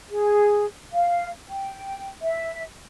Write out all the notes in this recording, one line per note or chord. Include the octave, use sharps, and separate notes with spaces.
G#4
F5
G5
E5